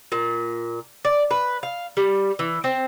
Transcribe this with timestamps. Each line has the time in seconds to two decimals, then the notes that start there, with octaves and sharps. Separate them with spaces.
0.12 A#2
1.05 D5
1.31 B4
1.63 F5
1.97 G3
2.39 E3
2.64 C4